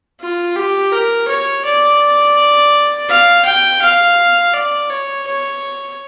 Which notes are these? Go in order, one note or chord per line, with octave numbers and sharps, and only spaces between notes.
F4
G4
A#4
C#5
D5
F5
G5
F5
D5
C#5
C#5